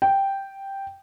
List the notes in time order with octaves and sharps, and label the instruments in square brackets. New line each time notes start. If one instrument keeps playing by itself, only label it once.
[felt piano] G5